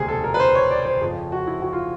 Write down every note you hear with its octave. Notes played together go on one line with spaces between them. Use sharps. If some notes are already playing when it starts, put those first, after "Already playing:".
Already playing: E1 D2 C3 G#4
A4
A#4
B4
C5
C#5
D5
C5
F2 C#3 F3
F#4
E4
F#4
F4